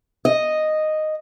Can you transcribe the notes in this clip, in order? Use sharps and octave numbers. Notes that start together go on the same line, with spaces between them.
D#5